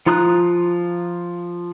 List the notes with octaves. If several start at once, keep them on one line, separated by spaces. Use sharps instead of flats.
F3 F4 A#5 D#6 F#6